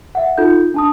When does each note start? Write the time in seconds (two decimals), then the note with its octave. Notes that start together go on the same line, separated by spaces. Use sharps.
0.15 E5 F#5
0.38 D#4 F4 A4 G6
0.74 D4 A5 D#6